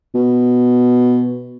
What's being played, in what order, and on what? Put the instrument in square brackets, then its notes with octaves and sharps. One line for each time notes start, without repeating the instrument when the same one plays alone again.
[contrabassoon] B2